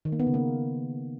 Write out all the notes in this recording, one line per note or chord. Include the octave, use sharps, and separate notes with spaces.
D#3
A#3
B3
C#3
A#3